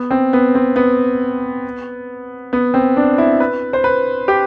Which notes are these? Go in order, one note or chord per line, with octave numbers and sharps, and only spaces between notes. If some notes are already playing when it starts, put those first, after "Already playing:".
Already playing: B3
C4
B3
C4
B3
B3
C4
D4
E4
B4
C5
B4
G4